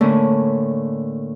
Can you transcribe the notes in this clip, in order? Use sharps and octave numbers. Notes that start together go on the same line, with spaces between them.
A2 D3 A3 A#3 C#4